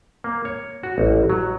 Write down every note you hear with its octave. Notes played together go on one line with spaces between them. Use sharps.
A#3
C#5
F#4
A1
F#3